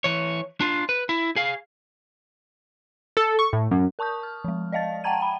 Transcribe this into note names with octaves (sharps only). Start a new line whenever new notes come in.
E3 C#5
D4 F4
B4
E4
G#4 F5
A4
C#6
A2
F#2
A#4 A5 C#6 D#6 G6
F6
F3 G#3
D5 D#5 F5 A5 A6
F#5 G5 A5 A#5 G#6 D#7
G5 B5